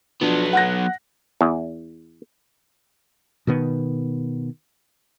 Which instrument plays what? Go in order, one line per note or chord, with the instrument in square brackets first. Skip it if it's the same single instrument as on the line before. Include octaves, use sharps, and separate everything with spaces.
[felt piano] F3 D4 [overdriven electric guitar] F#3 B3
[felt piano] F#5 F#6 A#6
[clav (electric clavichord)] E2
[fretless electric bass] B2 D#3 B3